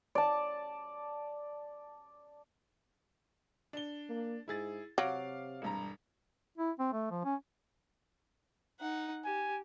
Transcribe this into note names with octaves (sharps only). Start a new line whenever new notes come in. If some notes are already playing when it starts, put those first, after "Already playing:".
D5 A5
D4 G7
A#3
G#2 E4 G#4 A6
C3 F#3 F5 D6 D7
E1 G2 A#5
E4
C4
A3
F3
C#4
D#4 F#5
G4 G#5